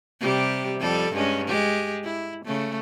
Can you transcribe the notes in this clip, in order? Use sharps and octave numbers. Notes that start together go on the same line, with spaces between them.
C3 G3 G4
F2 G3 A4
G2 G#3 C#4
G#3 G4
E4
C#3 A3